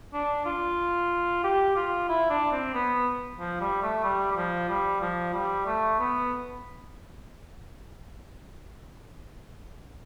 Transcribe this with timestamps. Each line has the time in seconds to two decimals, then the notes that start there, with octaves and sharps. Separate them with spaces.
0.13 D4
0.46 F4
1.44 G4
1.76 F4
2.09 E4
2.30 D4
2.52 C4
2.74 B3
3.39 F3
3.61 G3
3.83 A3
4.04 G3
4.32 G3
4.36 F3
4.69 G3
5.01 F3
5.34 G3
5.66 A3
5.99 B3